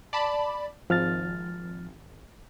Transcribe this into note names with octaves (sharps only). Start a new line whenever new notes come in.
D5 A5 B5
G#1 F3 F6 A6